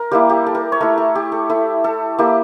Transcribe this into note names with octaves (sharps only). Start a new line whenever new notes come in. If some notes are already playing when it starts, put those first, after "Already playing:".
Already playing: A#4
G3 A#3 E4 G4
G4
A4
A#4
C#5
A3 E4 A#4
A4
G4
A4
A3 E4
A4
A#3 E4 G4